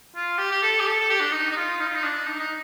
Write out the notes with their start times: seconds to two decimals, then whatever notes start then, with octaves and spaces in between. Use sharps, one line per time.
0.16 F4
0.38 G4
0.51 G4
0.62 A4
0.79 G4
0.86 A4
1.00 A4
1.10 G4
1.20 D4
1.32 D#4
1.50 D#4
1.56 F4
1.80 D#4
1.87 F4
1.95 D#4
2.03 D4
2.27 D#4
2.39 D#4